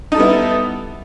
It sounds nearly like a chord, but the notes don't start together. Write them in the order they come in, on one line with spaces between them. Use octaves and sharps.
D#4 A4 G3 B3 E4